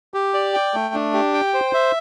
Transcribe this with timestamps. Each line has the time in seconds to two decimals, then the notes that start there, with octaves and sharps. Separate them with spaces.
0.14 G4
0.34 D5
0.54 G5
0.74 A3
0.94 D4
1.14 G4
1.34 G5
1.54 C5
1.74 E5